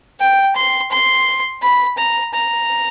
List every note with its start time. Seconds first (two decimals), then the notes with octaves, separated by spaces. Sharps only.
0.20 G5
0.56 C6
0.91 C6
1.62 B5
1.98 A#5
2.34 A#5